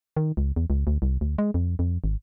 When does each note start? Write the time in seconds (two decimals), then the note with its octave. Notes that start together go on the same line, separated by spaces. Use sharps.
0.17 D#3
0.37 C#2
0.56 E2
0.70 C#2
0.87 D2
1.02 C2
1.21 D2
1.38 G#3
1.54 F2
1.79 F2
2.04 G#1